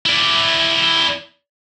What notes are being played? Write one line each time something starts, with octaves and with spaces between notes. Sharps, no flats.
E4 D5